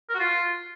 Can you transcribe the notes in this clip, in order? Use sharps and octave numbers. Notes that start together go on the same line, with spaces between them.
A#4
F#4
F4